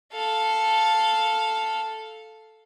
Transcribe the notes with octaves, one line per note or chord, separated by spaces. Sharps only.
A4 F5